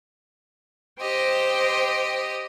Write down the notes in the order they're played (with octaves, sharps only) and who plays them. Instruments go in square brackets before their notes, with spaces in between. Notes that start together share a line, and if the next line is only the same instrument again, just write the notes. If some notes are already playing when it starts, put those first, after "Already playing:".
[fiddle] G4 D#5 [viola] C5 G5